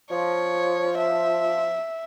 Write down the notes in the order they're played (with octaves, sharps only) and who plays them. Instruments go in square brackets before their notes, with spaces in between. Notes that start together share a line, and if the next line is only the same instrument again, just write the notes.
[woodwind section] F3 [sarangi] C#5
[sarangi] E5